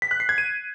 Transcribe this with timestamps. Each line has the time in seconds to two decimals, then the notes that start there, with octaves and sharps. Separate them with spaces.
0.02 B6
0.11 F#6
0.20 C7
0.29 G#6
0.38 D#7